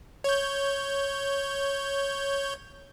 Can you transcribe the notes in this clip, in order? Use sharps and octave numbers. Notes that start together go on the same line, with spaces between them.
C#5 G6